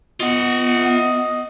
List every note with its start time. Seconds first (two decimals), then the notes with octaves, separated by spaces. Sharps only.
0.20 B3 F4 D#5 F#5